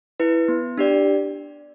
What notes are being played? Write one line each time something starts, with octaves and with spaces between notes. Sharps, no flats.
E4 B4
B3
D4 G4 D5